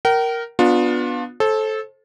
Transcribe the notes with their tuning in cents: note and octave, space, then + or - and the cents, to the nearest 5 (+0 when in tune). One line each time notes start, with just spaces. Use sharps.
A#4 +0 G5 -40
B3 +0 D4 +0 F4 +30
A4 -15 C5 +35